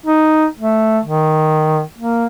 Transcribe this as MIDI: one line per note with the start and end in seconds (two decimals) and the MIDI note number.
0.06 0.46 63
0.59 0.99 57
1.05 1.82 51
1.99 2.26 58